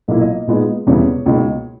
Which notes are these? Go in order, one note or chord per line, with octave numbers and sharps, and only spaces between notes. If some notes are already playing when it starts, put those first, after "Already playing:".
B1 A#2 A#3 E4 D#5
D#5
A#2 G#3 B3 D#4
E1 E2 C#3 G3 B3 C#5
C#2 B2 A#3 D#4